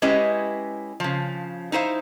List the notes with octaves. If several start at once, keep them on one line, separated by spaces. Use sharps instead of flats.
G#3 C#4 E4 G4 B4 D#5
C#3 F3
D#4 E4 C5 F5